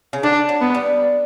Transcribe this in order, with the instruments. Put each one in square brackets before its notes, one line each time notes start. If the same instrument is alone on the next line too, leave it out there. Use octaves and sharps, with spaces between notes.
[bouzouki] C#3
[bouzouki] D3 [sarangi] D4
[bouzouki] F#3
[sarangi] B3
[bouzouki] G3